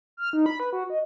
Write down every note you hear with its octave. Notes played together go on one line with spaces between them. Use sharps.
F6
D#4
B5
B4
F#4
D#5